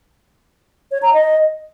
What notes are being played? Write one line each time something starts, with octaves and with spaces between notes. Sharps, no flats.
C#5
A#5
D#5